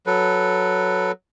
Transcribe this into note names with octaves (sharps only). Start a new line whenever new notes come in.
F#3 A4 B4